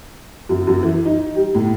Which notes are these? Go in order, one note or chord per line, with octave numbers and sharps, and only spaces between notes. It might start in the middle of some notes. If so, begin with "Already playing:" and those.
F#2
F#2
E3
D#4
G3
A2